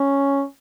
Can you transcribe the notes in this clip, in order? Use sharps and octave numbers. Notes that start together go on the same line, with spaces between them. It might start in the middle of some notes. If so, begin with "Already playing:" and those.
Already playing: C#4